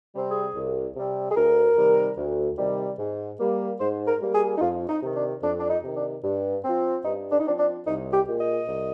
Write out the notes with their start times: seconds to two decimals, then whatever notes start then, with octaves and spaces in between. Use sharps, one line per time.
0.15 C3 G3 C4
0.28 G#4
0.55 C2
0.96 C3 G3 C4
1.31 G#4
1.37 D2 A#4
1.77 C3 D#3 G3
2.17 D2
2.58 C3 D#3 G3
2.99 G#2
3.39 G3 A#3
3.80 G#2 C5
4.07 A#4
4.21 G3 A#3
4.34 G#4
4.57 D#4
4.61 F2 F4
4.89 D#4
5.02 C3 D#3
5.15 D4
5.43 F2 D4
5.59 D4
5.70 D#4
5.83 C3 D#3
5.97 D4
6.24 G2
6.64 F3 C4
7.05 G2 D#4
7.32 D4
7.40 D#4
7.46 F3 C4 D4
7.59 D4
7.87 C2 D#4
8.13 G4
8.27 A#2 G#3
8.41 D#5
8.67 C2